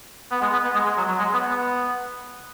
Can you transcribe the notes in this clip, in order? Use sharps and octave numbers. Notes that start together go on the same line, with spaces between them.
B3
G#3
B3
B3
G#3
G#3
F#3
F#3
G#3
B3
B3